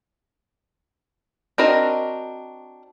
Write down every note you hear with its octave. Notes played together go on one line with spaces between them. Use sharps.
C4 D4 F#4 A#4 D#5